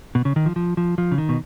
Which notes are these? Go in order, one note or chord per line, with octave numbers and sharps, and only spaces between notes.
B2
C#3
D#3
F3
F3
F3
F3
C#3
D#3
B2